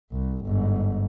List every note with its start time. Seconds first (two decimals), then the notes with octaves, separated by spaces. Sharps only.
0.12 C2
0.46 G1 G#2